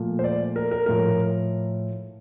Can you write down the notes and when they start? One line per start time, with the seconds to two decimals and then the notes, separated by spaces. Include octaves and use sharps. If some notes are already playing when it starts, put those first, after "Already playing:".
Already playing: A#2 F3 A3
0.19 C5
0.24 D5
0.56 A#4
0.71 A#4
0.86 A2 F3 A3 A#4